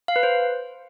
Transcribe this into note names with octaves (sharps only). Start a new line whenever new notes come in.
F5
B4
C5